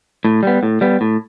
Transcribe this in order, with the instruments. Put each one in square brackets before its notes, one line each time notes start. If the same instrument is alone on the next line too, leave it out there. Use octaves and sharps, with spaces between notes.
[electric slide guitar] A2
G3 B3
A2
G3 B3
A2